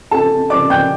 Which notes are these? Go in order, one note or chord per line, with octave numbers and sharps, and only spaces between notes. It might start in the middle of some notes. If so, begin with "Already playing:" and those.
A4 A5
D5 D6
G5 G6